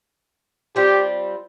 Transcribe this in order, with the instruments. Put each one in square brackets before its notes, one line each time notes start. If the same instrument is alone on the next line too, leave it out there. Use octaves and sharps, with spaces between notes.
[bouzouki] G3 C4 F4 [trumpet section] G4